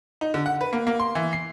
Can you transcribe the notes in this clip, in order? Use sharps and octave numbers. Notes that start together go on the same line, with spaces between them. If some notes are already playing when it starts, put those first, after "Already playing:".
D#4
D3
F#5
B4
A#3
A#3
C6
E3
C7